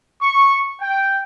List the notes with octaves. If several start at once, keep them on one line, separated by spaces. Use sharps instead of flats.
C#6
G5